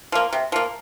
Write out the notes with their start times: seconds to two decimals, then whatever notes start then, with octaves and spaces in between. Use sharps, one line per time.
0.12 F3 A#3
0.33 C3
0.52 F3 A#3